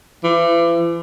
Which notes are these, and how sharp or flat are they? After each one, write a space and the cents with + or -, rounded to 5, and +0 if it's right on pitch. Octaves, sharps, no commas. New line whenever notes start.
E3 +40